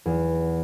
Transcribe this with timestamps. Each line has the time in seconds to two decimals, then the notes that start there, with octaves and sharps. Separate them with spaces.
0.06 E2